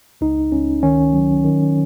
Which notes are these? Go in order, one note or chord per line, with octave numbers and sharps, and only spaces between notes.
C#2 D#4
C#2 C#4
D#3 C#4
F#3
D#3